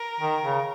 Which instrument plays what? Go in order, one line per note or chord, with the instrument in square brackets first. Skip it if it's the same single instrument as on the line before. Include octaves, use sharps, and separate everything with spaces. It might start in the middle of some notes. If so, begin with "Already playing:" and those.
Already playing: [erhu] A#4
[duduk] D#3
C#3